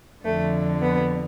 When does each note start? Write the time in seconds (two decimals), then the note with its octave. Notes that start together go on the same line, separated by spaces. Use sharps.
0.24 F2 D3 A3
0.81 B3